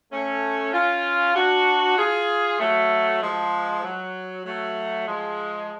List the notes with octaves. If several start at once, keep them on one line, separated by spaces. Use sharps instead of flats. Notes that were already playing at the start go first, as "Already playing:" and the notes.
A3 C#4
C#4 F4
D4 F#4
F4 G#4
F#3 A3
F3 G#3
F#3
F#3 A3
F3 G#3